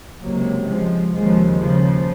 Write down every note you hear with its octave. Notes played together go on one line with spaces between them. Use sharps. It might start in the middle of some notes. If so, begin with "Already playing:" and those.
C#2 C3 F#3 A#3
F3 G#3
D#2 C#3 F3 G#3
C#3 F3